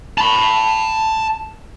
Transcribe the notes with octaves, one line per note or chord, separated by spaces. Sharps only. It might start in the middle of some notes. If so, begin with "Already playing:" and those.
A5 B5